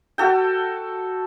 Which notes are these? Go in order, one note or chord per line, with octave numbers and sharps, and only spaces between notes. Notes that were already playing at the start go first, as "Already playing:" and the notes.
F#4 A4 G5